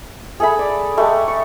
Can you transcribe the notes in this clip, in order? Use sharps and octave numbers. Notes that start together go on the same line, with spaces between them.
G#4 A4 E5 B5
D5
G#3 A3 G4
C#6